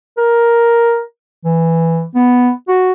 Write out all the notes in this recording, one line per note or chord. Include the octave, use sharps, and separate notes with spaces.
A#4
E3
B3
F#4